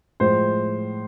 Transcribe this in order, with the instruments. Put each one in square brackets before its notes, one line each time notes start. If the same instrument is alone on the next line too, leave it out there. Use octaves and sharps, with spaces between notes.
[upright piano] A2 F3 G#3 C5